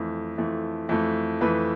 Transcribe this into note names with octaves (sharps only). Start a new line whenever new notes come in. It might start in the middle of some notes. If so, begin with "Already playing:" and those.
Already playing: F2 E3 A3
F2 E3 A3
F2 E3 A3
F2 E3 A3 B4